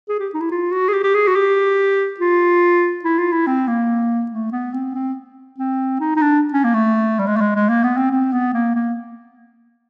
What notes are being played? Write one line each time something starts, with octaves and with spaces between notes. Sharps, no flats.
G#4
G4
D#4
E4
F4
F#4
G#4
G4
G4
G#4
F#4
G4
F4
E4
F4
E4
C4
A#3
A3
B3
C4
C4
C4
D#4
D#4
D4
C#4
A#3
A3
G3
G#3
A3
G#3
G#3
A#3
B3
C4
C4
B3
A#3
A#3